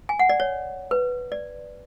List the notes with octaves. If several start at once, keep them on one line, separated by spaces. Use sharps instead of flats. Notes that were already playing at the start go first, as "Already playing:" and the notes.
G#5
F#5
D5
C#5
B4
D5